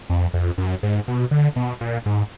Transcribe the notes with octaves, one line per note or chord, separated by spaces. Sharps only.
F2
F2
F#2
G#2
B2
D3
B2
A#2
G#2